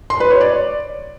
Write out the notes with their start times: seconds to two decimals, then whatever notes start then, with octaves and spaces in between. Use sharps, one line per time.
0.10 C6
0.20 B4
0.30 C#5
0.41 D5